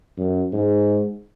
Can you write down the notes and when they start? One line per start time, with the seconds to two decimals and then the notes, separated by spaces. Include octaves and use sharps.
0.17 F#2
0.52 G#2